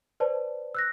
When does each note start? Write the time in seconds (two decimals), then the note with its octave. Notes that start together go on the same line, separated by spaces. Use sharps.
0.20 B4 C5 D5 A5
0.75 E6 F#6 A#6